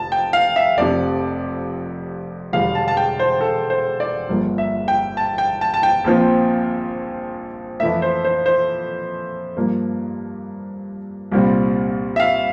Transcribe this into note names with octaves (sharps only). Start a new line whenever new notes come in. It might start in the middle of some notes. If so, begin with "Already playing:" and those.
Already playing: F1 F2 A5
G5
F5
E5
F1 F2 C3 D5
E1 E2 D3 G3 F5
A5
A5
G5
C5
A4
C5
D5
G1 G2 F3 A#3
E5
G5
A5
G5
A5
A5
G5
A#1 A#2 F3 C4
F2 E3 A3 E5
C5
C5
C5
G2 F3 A#3
C2 A#2 G3 C4
E5
F5